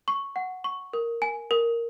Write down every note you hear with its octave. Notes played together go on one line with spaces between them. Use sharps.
C#6
F#5
C#6
A#4
G#5
A#4